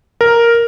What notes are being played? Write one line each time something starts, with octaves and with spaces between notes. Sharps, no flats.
A#4